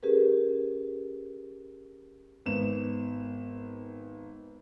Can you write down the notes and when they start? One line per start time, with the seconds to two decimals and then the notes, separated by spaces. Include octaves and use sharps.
0.03 C#4 G4 G#4 A#4 B4
2.46 G#1 B3 E7